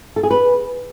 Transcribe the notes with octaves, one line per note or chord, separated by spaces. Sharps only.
A4
G#4
B4